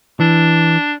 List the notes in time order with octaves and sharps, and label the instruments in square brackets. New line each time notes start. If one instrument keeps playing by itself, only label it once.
[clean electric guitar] E3 [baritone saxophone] D4